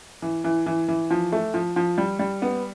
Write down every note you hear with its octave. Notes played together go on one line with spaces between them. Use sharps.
E3
E3
E3
E3
F3
A3
F3
F3
G3
G3
B3